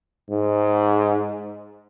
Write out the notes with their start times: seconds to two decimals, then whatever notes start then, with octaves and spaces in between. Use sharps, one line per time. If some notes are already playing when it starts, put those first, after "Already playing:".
0.31 G#2